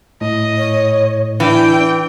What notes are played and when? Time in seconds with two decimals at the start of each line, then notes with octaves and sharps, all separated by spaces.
0.21 A2 D#5
0.58 C#5
1.40 E3 D4 G5